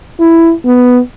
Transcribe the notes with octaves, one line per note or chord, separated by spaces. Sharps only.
E4
B3